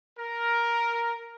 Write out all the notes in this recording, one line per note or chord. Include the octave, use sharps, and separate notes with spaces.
A#4